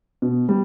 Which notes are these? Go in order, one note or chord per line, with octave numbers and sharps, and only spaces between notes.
B2
G3